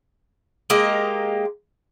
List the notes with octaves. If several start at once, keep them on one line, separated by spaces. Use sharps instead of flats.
G#3 A#3 G4 D#5